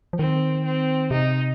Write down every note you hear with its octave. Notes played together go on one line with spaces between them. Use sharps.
F3
D#3 C4
C4
C3 D#4